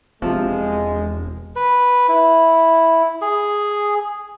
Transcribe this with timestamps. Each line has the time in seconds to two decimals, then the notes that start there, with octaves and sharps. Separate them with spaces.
0.22 E1 C3 F3 G#3
1.56 B4
2.08 E4
3.22 G#4